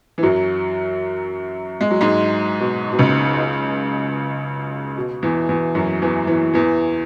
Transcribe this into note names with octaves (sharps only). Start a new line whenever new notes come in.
E3
F#2 F#3
G#3
F#3
G#2 G#3
B2
B2
C#2 C#3
B2
E2 E3
E2 E3
F#2 F#3
E2 E3
E2 E3
E2 E3